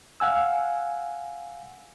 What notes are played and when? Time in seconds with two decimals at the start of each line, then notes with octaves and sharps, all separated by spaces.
0.20 F5 F#5 G#5 E6